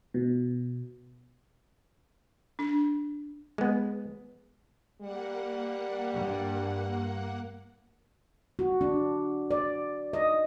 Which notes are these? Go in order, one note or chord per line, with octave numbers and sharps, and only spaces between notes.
B2
D4
G#3 B3
G3 A#3 F#5
G2
F#4
D4
D5
D#5